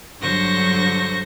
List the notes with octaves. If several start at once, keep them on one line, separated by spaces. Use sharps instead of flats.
G2 D3 F#3 C5 C#6 A#6